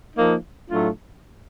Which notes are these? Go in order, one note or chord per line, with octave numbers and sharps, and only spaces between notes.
F3 A#3 D#4
A2 F#3 A3 D4 F4